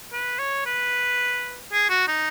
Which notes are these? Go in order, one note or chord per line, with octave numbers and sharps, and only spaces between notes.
B4
C#5
B4
G#4
F#4
D#4